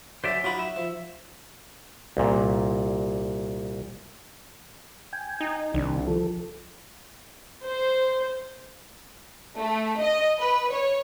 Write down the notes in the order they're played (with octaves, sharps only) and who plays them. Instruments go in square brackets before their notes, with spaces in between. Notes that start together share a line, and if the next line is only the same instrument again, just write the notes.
[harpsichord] F#3 C#4 [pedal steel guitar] C5 D5 E5
[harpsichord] F#3 D#4 F#4 [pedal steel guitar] F4 B5
[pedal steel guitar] E5
[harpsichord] F3
[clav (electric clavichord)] C2 A#2
[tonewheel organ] G5 G#5
[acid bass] D#4
[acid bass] C2 [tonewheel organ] C3 D#3 D4
[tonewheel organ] F3 A4
[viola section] C5
[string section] A3
D#5
B4
C#5